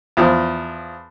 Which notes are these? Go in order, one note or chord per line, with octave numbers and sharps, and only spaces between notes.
E2 F3